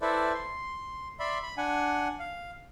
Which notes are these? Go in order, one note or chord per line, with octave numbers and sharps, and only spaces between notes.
E4 A4 B4 C5 D5 E5
C6
D5 E5 B5 C6
B5
D4 F#5 G#5
F5